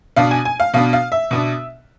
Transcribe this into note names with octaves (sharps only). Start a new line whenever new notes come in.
B2 B3 D4 F5
G#5
G#5
F5
B2 B3 D4 F5
F5
E5
B2 B3 D4